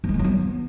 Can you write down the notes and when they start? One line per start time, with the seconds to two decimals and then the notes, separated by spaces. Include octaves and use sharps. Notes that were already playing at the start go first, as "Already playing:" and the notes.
0.04 F3
0.09 G#3
0.14 E3
0.19 F#3
0.24 B3